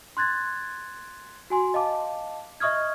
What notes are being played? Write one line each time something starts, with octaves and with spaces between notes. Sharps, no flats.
C6 F#6 G#6 A6
F#4 G#5 C6
D#5 F5 A5 D6
D#5 E5 C#6 D#6 F6 G#6